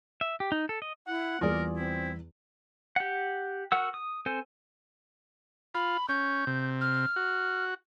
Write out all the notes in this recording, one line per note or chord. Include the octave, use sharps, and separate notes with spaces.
E5
G4
D#4
A4
D#5
E4 F#5
E2 G3 A#3 F4 G#4 A#4 D5
C4 E4
G4 F#5
F#4 A#4 F#5 E6
D#6
C4 A4 C5 G#5
F4 B5
C#4 G6
C3
F6
F#4